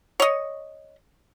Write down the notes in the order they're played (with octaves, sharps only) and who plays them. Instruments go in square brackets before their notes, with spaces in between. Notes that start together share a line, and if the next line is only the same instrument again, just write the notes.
[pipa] C#5 D#5